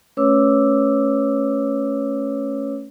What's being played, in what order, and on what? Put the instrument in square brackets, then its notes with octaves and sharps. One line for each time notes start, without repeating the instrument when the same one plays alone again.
[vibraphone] A3 C#4 B4 C#5 D6 E6